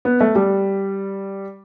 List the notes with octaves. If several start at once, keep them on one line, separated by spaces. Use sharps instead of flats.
B3
A3
G3